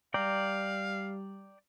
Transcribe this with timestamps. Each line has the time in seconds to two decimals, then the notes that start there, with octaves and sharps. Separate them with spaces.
0.14 G3 D5 F5 G5 A#5